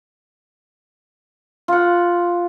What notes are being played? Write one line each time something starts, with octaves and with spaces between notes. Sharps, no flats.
F4 F#5